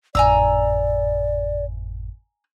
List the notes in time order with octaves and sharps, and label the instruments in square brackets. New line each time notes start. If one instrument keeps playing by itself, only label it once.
[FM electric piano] G#1 F2 A2 [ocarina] D5 [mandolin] G#5 A#5 E6